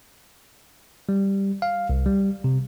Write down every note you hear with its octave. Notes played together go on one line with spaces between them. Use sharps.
G3
F5
C2
G3
C3